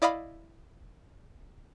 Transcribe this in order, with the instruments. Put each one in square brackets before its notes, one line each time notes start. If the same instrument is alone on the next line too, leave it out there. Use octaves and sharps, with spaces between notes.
[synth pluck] E4 D5 D#5 F5 B5